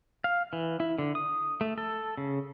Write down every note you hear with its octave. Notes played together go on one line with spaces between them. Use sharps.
F5
E3
E4
D3
D#6
A3
A4
C#3